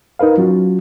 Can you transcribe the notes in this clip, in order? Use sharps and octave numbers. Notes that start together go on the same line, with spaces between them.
D#4 A#4 B4 F5
F#3 C#4 F4 F#4